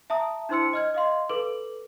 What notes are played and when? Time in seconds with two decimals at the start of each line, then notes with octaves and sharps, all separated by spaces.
0.10 E5 A5 A#5 D#6
0.49 D4 E4 C5 C6 E6 C#7
0.73 D#5 F6 G#6
0.94 D#5 F5 C6
1.29 A4 B4 D6 F#7